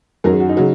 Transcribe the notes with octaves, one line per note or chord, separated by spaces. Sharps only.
F#2 D#3 F#3 A#4
G#4
F#4
D#4
C#3 F#3